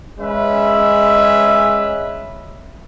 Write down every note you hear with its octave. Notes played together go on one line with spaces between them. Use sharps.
G#3 C#4 B4 E5